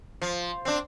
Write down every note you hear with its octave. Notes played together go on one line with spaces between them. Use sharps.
F3
C4 D4